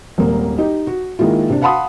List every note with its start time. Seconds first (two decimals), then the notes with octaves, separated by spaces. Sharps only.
0.18 D#1 G#1 A#3
0.58 D#4 G4 D#5
0.87 F#4
1.19 D#3 G#3 A#3 E4 F4
1.50 C3 D4
1.62 F5 F#5 A5 B5 C6 D#6